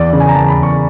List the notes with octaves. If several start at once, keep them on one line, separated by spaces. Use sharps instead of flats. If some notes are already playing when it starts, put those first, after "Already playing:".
Already playing: E2 D5
C#3
G#5
A#5
E2 A5
B5
E2
C#6